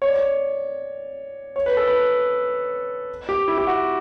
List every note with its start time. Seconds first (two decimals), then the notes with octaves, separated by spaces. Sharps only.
0.02 C#5
0.08 D5
0.16 C#5
1.56 C#5
1.66 B4
1.77 A4
1.87 B4
3.29 G4
3.48 E4
3.58 G4
3.67 F#4